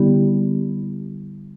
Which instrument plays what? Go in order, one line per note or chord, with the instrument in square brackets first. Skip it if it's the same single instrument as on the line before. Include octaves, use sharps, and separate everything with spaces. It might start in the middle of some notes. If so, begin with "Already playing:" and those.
Already playing: [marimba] D3 G3 B3 E4 G4